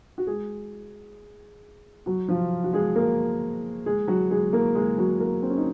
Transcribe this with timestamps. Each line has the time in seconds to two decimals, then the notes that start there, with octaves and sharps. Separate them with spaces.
0.18 F#4
0.27 G#3 G#4
2.06 F#3 F#4
2.28 F3 F4
2.64 F#4
2.73 G#3 G#4
2.96 A#3 A#4
3.86 G#3 G#4
4.08 F#3 F#4
4.31 G#3 G#4
4.53 A#3 A#4
4.75 G#3 G#4
4.98 F#3 F#4
5.20 A#3 A#4
5.42 C4
5.50 C#4
5.57 D#4